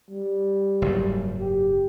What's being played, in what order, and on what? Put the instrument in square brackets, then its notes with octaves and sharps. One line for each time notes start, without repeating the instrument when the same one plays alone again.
[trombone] G3
[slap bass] F#1 G#2
[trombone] G4